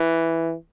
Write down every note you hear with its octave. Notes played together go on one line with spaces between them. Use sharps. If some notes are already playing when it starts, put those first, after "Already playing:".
Already playing: E3